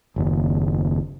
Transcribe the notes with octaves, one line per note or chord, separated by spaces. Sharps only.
F#1 D#2